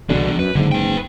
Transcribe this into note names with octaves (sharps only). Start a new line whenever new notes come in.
C2 B2 D3 E3 D4
F#2 B4
F#1 G#2 D3
B4 G5